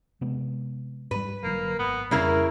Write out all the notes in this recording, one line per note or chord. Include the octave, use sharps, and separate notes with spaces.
C3 G#3 B3
G#2 G3 B4
F#1 D3 F#3 A#3
G#1 B3
F2 C#3 G3 A#3 E4 A#4